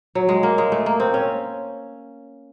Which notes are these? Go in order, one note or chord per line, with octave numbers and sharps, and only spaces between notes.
F#3
G#3
A#3
G#3
A3
A#3
C4
C#4